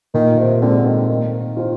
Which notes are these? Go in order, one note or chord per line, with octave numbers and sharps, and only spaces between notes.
A#2 D#3
C3
D3 G#3 C4
D#3
D#3 A#3
F4 C5